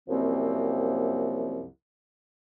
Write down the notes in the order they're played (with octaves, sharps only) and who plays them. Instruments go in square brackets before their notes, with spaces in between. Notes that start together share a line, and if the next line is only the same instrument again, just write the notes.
[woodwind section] C2 F#2 F3 A#3 C4